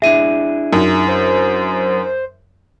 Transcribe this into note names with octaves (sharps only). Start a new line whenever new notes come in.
D4 E4 G#4 E5 D#7
F#2 D#4
C5